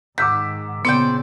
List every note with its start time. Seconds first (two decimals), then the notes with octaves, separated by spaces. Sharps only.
0.18 G#2 D#3 F#5 D6 E6 G6 B6
0.85 A#2 C#3 B3 C5 D5 G5